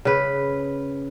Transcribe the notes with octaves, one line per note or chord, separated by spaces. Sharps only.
C#3 B4